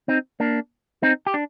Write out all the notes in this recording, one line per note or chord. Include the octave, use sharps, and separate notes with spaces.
C4 D#4
A#3 D4
C4 D#4
G4
D4